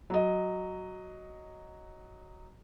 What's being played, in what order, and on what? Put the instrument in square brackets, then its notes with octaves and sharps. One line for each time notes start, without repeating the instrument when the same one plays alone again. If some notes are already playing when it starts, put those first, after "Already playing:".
[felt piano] F#3 D#5